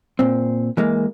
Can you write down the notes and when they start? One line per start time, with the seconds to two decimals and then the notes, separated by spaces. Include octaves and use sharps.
0.19 A#2 C4
0.77 E3 G#3 A#3